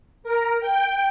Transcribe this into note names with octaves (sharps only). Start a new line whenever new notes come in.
A#4
G5